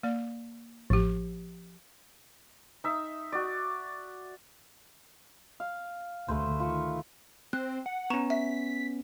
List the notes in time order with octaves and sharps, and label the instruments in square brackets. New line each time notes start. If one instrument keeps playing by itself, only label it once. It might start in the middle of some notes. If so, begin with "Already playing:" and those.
[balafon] A#3 D5
[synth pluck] A1 [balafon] F3 G4
[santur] D#4 E5
F#4 D5
[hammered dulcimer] F5
[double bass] D2 D3 [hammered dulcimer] A3 B4 C5
[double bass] D#3 [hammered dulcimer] F4 C#6
[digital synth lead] C4 [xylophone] F#6
[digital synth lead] F#5
[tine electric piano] B3 C#4 [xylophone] A#5 C#6 E7
[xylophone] E5 [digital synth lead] B6